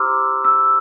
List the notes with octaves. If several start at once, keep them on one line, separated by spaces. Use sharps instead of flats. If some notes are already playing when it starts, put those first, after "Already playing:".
Already playing: E4 G4 C5 A#5 C6 D6 E6 F6
E6